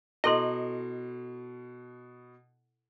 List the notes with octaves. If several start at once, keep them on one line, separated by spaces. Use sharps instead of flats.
B2 E4 A4 D#5 C6